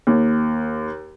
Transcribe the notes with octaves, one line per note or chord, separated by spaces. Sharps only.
D#2